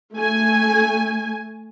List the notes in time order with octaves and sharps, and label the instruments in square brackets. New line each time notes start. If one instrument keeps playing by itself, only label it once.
[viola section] A3 G#5